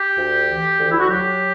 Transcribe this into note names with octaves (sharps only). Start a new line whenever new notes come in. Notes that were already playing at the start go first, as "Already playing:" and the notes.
Already playing: G4
D2
E3
D2
E4
F#4
F#3 G4